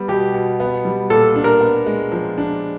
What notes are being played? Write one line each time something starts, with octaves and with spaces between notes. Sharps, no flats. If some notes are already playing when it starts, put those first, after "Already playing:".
Already playing: G3 B3
B2 G4
B2
B3
G3
A#2 A4
D4
A#4
B3
G#3
F3
D4